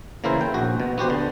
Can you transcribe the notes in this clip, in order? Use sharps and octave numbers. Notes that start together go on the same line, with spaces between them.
C#3 E3 A#3 E4 A#4 C5
G5
A#1 F#4
B2
B3 F#4 G4 C5
D3